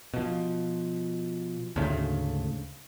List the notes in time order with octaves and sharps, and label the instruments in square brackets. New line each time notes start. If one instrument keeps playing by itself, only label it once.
[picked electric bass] B2 F3
D2 G#2 C#3 A3